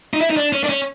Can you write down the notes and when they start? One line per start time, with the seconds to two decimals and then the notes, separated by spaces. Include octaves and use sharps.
0.13 D#4
0.21 E4
0.30 D#4
0.37 D4
0.52 C#4
0.64 D4
0.69 C#4